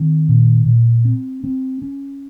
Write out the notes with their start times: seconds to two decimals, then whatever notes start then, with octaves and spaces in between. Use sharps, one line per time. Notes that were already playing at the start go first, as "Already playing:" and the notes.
Already playing: D#3 C4
0.29 A#2
0.66 A#2
1.05 C4
1.44 C4
1.82 C#4